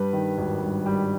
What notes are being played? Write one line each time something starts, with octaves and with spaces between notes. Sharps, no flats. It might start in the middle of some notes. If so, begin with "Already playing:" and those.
Already playing: G2 G3 B4
D#3
G#1
G2
G3